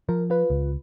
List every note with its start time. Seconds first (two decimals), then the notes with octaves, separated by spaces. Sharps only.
0.09 F3 A#4
0.30 F4 B4
0.50 C#2